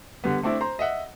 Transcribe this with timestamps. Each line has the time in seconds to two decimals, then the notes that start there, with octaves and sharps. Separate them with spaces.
0.24 D3 G3 B3
0.43 A3 C4 D4 E4
0.61 C5 A#5 C6
0.79 D#5 E5 F#5